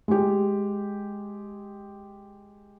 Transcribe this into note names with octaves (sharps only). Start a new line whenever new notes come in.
G#3 G4